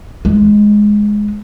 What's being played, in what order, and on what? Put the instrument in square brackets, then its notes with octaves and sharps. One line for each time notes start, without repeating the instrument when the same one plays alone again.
[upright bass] G#3